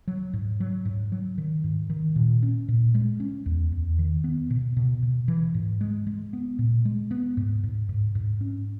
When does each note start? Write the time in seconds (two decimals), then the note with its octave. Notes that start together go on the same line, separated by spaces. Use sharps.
0.07 F#3
0.33 G#2
0.60 F#3
0.85 G#2
1.12 F#3
1.38 D#3
1.64 G#2
1.90 D#3
2.16 A#2
2.43 C#4
2.68 A#2
2.95 G#3
3.20 C#4
3.46 E2
3.72 E2
3.99 D#3
4.24 B3
4.50 B2
4.77 B2
5.03 B2
5.28 E3
5.54 G#2
5.81 G#3
6.07 G#3
6.33 B3
6.59 A#2
6.85 G#3
7.11 B3
7.37 G#2
7.63 G#2
7.89 G#2
8.15 G#2
8.41 C#4